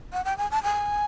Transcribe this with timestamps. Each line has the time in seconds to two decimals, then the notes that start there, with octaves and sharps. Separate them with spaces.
0.13 F#5
0.25 G5
0.38 G#5
0.51 A5
0.63 G#5